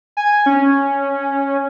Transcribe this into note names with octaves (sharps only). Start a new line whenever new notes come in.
G#5
C#4